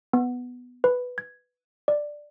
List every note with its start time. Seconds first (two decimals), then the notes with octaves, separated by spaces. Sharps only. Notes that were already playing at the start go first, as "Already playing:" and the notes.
0.13 B3
0.84 B4
1.18 G#6
1.88 D5